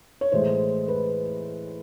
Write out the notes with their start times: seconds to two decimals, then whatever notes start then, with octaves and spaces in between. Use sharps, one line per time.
0.21 C#5
0.32 A2 E3 G#3 C5
0.88 B4